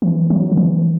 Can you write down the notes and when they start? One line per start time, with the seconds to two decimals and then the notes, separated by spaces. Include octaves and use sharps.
0.02 E3
0.30 F#3
0.52 D3
0.57 E3